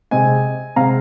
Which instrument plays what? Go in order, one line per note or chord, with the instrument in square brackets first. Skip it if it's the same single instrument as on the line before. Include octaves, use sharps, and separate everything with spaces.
[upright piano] C3 G#3 C4 D#5 G#5
C3 G#3 C4 F5 A#5